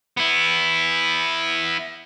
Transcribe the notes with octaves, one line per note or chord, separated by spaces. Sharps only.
B3 E4